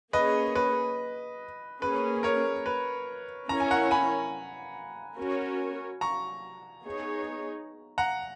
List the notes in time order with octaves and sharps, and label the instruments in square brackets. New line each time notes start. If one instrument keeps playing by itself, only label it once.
[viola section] A#3 C#4 G#4 C#5 [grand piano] B4 D#5
[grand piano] B4
[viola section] A#3 C#4 G#4 [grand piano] B4
[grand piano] A#4 C#5
B4
[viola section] C#4 E4 A#4 C#5 [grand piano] A#5
[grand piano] G#5
F#5 A#5
G#5 B5
[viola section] C#4 F#4 A#4 C#5
[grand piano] A#5 C#6
[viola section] B3 D#4 G#4 C#5
[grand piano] F#5 A#5